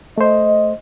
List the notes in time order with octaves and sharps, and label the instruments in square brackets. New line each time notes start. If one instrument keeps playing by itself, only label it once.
[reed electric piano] A3 C5 [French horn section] D#5